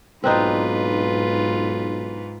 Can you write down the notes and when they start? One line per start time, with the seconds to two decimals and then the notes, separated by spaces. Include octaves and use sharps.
0.24 B1 G#2 C4 D4 D#4 F4 B4